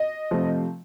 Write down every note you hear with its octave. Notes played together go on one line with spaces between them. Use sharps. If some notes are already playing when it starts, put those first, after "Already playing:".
Already playing: D#5
C3 F3 A3 C4